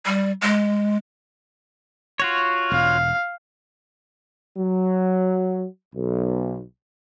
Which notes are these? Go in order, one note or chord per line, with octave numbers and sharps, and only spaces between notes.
G3
G#3
F4 F#4 C#5
E1 F5
F#3
B1